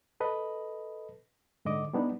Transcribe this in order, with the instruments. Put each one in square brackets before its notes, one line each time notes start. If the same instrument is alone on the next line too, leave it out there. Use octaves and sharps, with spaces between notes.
[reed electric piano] A4 B4 D#5
G#2 D3 D#5 D6
G3 B3 D4 D#4